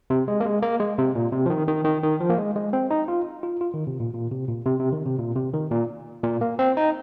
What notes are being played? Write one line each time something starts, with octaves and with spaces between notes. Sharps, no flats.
C3
G#3
A#3
G#3
A#3
G#3
C3
A#2
C3
F3
D#3
D#3
D#3
D#3
F3
A#3
G#3
G#3
C4
D#4
F4
F4
F4
D#3
C3
A#2
A#2
C3
A#2
C3
C3
D#3
C3
A#2
C3
D#3
A#2
A#2
A#3
C4
D#4